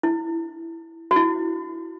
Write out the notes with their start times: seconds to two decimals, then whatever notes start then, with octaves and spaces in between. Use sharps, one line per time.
0.03 E4
1.11 F#4
1.16 E4